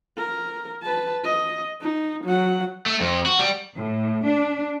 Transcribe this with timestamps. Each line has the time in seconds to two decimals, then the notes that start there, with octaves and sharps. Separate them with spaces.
0.17 A#4
0.83 B4 A5
1.24 D#5
1.81 D#4
2.25 F#3 F#5
2.86 A3
3.00 F2
3.26 F#4
3.39 G3
3.77 A2
4.26 D4